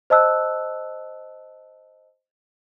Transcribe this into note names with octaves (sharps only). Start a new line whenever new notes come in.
C5 D#5 A5 E6 F#6